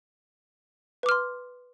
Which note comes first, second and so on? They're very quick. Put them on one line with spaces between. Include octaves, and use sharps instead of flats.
B4 D6 F6 C6